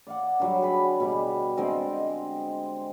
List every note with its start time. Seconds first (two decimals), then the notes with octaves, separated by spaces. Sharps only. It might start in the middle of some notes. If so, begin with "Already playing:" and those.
0.07 D5 F5 F#5
0.40 D3 F#3 G3
0.62 G#4 B4 B5
1.00 B2 G3
1.57 D3 G#3 C4 D#5